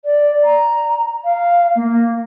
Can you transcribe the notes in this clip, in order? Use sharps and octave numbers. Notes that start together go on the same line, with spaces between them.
D5
A#5
F5
A#3